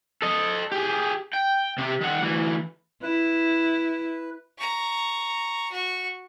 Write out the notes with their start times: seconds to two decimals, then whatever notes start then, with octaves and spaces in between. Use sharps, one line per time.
0.22 A4 D#5
0.72 G4 G#4
1.33 G5
1.78 C3 G4
2.01 D#3 F#5
2.21 D2 E3
3.03 E4 B4
4.58 A#5 C#6
5.71 F#4 C#6